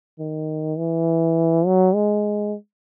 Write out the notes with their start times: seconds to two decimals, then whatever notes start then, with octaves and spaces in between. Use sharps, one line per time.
0.19 D#3
0.77 E3
1.66 F#3
1.95 G#3